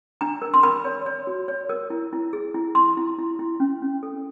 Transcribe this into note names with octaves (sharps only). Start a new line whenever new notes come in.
D4 A#5
A#4
C6
A#4 B5
C#5
C#5
F#4
C#5
A#4
E4
E4
G#4
E4
E4 C6
E4
E4
E4
C#4
C#4
A4